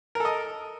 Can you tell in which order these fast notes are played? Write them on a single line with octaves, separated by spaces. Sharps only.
A#4 A4 D#5